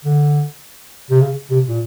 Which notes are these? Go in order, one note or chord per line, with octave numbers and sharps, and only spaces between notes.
D3
C3
C#3
C3
A#2